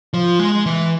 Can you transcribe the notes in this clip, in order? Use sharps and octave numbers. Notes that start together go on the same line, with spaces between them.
F3
G#3
E3